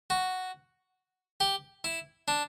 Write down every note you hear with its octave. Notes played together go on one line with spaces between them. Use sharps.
F#4
G4
E4
D4